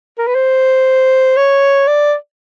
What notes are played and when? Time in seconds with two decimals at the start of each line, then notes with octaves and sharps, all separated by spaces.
0.18 A#4
0.27 B4
0.35 C5
1.37 C#5
1.88 D5